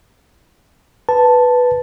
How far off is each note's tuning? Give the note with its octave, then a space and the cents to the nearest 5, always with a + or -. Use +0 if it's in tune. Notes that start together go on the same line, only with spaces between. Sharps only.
B4 +0 A5 +0